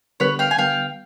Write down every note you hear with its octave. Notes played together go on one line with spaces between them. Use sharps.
D3 G3 B3 B4 C#5
F5 G5
G#5
D3 G3 B3 F5 G5